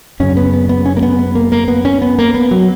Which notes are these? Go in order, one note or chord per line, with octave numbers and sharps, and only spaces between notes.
F#2 C#3 C#4
B3
B3
B3
C#4
A#3
B3
B3
A#3
A#3
B3
C#4
B3
A#3
B3
F#3